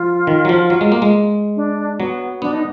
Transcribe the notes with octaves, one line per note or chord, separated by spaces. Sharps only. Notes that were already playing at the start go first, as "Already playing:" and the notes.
Already playing: F3 F4
D#3
F#3
F3
F#3
G#3
A#3
G#3
D4
F#3 B3
B3 D4
D#4